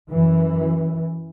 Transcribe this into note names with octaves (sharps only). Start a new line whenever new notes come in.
F#2 E3